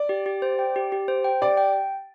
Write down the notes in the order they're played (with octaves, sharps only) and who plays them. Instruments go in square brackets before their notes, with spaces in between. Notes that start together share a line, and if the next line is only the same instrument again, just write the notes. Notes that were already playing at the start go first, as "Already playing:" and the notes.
Already playing: [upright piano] D5
[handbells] G4
G4
C5
G5
G4
G4
C5
G5
[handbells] G4 [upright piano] D5
[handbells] G5